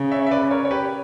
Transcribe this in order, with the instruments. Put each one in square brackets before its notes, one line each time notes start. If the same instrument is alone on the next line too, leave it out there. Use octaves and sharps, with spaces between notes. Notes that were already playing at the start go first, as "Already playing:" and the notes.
Already playing: [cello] C#3
[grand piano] C#5 E5
E5
B4 D5
A#4 C#5
C#5
G4 B4